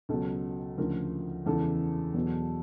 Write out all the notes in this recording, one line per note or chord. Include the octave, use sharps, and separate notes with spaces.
C#2 B2 F#3 A4
D2 C#3 F3 A#4
E2 C#3 E3 A4
E2 B2 F#3